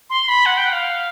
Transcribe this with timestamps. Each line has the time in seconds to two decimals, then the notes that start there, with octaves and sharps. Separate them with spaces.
0.10 C6
0.28 B5
0.46 F#5
0.58 G5
0.65 F#5
0.72 F5